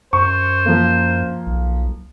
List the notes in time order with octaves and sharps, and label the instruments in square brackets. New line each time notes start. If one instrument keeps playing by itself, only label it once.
[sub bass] F#2 [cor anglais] C5 [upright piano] C#6
[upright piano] F3 A#3
[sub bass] B1